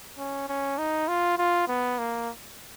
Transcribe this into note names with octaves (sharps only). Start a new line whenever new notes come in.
C#4
C#4
D#4
F4
F4
B3
A#3